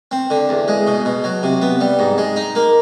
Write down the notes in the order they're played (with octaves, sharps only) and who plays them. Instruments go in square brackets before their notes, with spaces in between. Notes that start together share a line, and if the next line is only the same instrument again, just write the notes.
[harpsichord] C4
D3
E2
G#3
B2
B2
F#3
C3
B3
G3
G#2
G#3
D#4
A#3